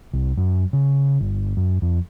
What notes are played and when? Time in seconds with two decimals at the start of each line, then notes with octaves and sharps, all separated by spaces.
0.13 C2
0.37 F#2
0.73 C#3
1.21 G1
1.57 F#2
1.82 F2